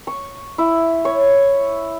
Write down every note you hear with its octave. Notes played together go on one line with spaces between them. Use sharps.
C#6
E4
C#5